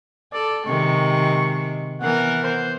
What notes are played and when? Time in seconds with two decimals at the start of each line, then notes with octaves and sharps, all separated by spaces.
0.33 A4 D5
0.66 C3 D#3 G#3 C#6
2.01 E3 B3 A#4 F#5
2.44 C5